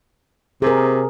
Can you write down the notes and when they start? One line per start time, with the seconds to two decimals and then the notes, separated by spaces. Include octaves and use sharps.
0.62 C3 G#4 A#4